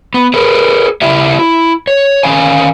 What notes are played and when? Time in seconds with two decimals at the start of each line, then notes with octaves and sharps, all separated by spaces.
0.14 B3
0.34 G#4 A#4 B4
1.02 C#3 E4 G4 E5
1.39 E4
1.87 C#5
2.23 D#3 C#4 F5 G#5